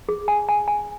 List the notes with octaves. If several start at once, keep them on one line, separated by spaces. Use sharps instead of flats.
G#4
G#5
G#5
G#5